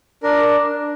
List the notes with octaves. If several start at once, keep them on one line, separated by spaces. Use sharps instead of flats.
D4 A#4